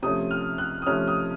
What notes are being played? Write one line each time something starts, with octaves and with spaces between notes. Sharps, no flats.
C3 F3 A3 C#4 D#6
F6
F#6
D#6
C3 F3 A3 C#4 F6
D#6